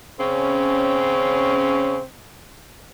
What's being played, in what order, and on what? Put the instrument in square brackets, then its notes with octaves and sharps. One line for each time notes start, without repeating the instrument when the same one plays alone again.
[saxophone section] C#3 C4 C#4